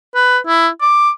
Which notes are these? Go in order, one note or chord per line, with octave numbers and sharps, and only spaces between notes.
B4
E4
D6